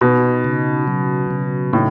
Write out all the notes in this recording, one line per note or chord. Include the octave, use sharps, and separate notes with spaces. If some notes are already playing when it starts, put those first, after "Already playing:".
B2 D#4
C#3
F#3
C#3
A2 D#4